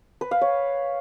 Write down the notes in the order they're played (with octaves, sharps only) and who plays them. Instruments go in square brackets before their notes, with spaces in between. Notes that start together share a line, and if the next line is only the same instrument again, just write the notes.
[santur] B4
F5
C#5